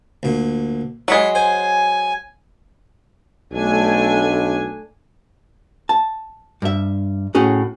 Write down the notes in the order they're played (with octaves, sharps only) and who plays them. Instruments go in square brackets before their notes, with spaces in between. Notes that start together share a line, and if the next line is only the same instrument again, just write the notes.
[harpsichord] D2 A#2
[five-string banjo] F#3 G#3 [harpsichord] F#5 B5
[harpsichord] C5 [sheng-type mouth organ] G#5
[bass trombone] B1 [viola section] A3 D4 G#5
[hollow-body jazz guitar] A5
G2 E5
A2 C#4 F#4 G#4